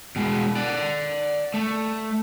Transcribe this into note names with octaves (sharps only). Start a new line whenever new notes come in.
B2 G#3
D5 F#5
A3